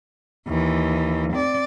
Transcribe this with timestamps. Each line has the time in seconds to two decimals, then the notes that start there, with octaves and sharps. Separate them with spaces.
0.48 D#2 E3
1.32 C4 D5